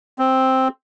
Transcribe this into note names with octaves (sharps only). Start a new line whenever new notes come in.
C4